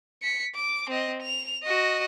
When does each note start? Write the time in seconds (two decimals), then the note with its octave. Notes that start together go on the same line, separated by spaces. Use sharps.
0.23 B6 C#7
0.55 D6
0.90 C4 D#5
1.22 F7
1.63 F#4 D#5